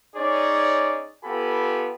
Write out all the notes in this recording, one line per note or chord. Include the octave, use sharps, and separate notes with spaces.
C#4 D#4 G#4 C#5 D5
B3 F4 G4 A4 G#5 B5